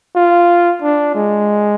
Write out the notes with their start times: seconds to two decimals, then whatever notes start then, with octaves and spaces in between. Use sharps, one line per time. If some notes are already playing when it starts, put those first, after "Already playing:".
0.16 F4
0.82 D4
1.15 G#3